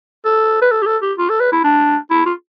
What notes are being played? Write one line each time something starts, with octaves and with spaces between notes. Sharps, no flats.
A4
B4
A4
G4
A4
G4
F4
A4
B4
E4
D4
E4
F4